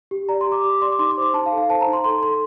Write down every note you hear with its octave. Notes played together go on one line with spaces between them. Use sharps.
G4
D5 A#5
C6
G4
D6
G4 D6
D5 C6
D6
D#4 C6
D6
C5
C6
D#4 A5
F5
A4
F5
C5 A5
A#5
D#4
C6
A4 C6
A4 C6